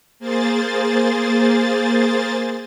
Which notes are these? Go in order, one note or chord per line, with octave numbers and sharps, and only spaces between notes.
A#3 G#4 C5 A6